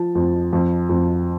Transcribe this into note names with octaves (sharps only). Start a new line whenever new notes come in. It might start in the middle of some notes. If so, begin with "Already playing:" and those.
Already playing: F3 A5
F2
F2
F2